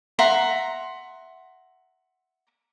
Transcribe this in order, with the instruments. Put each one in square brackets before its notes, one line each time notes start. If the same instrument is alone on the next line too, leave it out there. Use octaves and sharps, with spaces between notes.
[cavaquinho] E5 F#5 A#5 C6